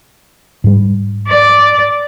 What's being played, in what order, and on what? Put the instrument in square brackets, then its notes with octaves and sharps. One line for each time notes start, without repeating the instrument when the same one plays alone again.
[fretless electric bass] G#2 G3
[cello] D5